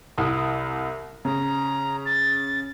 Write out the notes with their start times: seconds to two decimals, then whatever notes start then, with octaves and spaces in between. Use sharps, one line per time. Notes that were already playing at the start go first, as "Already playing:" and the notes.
0.18 C2 E4 D#6
1.25 C#3 A#5
2.06 A6